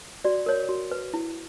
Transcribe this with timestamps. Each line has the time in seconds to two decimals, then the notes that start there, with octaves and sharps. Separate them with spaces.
0.25 F#4 D5
0.46 A#4 C#5
0.69 F#4
0.91 B4
1.14 E4